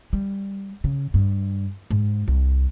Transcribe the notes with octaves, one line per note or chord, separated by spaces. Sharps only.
G3
C#3
G2
G#2
C2